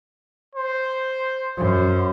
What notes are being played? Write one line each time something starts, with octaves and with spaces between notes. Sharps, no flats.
C5
F#2 C5